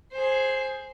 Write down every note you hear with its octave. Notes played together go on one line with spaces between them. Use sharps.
G#4 C5